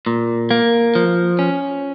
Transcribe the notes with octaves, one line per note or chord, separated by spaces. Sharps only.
A#2
A#3
F3
C#4